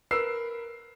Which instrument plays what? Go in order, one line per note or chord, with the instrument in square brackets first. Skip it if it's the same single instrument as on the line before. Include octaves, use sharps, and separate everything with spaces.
[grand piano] A#4 B4 E6 C7